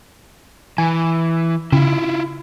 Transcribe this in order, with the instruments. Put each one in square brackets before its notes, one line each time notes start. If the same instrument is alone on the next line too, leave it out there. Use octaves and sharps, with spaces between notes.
[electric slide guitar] E3 [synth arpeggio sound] G#5
[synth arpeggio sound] C#3 [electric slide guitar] E4 F4